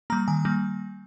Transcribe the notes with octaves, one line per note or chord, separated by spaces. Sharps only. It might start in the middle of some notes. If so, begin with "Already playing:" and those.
G3 A#3 A#5
D#3 G#5
G3 A#3